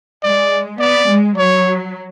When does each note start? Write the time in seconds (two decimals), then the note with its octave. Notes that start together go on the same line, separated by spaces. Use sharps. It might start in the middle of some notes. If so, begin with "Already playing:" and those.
0.23 G#3 D5
0.79 B3 D5
1.09 G#3
1.36 F#3 C#5